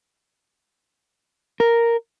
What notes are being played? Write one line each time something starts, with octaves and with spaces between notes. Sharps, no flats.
A#4